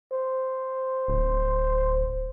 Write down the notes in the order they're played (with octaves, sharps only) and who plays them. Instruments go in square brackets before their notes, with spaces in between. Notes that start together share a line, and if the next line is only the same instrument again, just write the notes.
[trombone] C5
[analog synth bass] D1